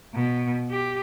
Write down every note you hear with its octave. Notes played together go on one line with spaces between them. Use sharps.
B2
G4